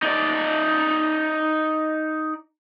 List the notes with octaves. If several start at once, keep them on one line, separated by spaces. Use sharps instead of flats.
D#4 D5